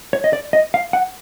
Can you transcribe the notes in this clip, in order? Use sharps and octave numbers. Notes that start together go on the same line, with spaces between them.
C#5
D#5
D5
D#5
F5
F#5